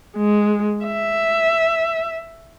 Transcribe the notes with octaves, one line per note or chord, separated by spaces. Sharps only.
G#3
E5